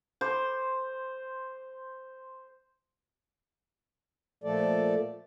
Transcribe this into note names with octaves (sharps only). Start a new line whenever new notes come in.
C5 D6
A#2 F3 A3 A4 D5